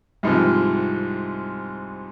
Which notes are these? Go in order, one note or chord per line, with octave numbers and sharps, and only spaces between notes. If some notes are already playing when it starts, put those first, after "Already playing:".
C2 G#2 C3 F3